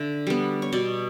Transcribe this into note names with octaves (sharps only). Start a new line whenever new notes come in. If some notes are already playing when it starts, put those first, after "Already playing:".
Already playing: D3 E5
G3 B3
C#5
B2 D5